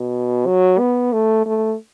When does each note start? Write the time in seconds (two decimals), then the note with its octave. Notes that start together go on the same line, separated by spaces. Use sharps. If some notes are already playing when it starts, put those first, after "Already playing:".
Already playing: B2
0.46 F#3
0.79 B3
1.13 A3
1.46 A3